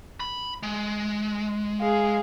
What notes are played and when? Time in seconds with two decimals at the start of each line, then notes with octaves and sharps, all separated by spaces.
0.20 B5
0.63 G#3
1.81 G#4 F5